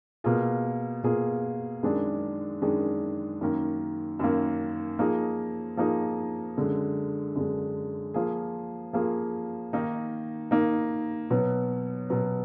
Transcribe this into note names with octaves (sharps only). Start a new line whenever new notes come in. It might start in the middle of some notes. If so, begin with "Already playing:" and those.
B2 A#3 F4 G#4
B2 A#3 F4 G#4
F#2 D#3 G#3 D4 G#4
F#2 D#3 G#3 D4 G#4
F#2 D#3 A#3
F#2 D#3 A#3
F3 A#3 D#4 G#4
F3 A#3 D#4 G#4
F#2 D3 G#3
F#2 D3 G#3
F3 A#3 F4 G#4
F3 A#3 F4 G#4
D#3 A#3 D#4
D#3 A#3 D#4
B2 F#3 B3
B2 F#3 B3